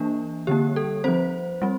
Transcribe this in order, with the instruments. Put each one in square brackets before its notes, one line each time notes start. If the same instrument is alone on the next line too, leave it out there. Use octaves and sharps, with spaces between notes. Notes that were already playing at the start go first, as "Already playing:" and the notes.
Already playing: [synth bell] E3 A#3 D4
D3 G3 A#3 G4
A4
F3 C4 C5
G3 C4